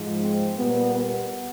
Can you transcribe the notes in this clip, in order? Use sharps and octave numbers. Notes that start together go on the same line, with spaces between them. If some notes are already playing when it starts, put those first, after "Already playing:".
Already playing: G#2 F3 G#3
C4
A#2 G3 A#3 B3
B3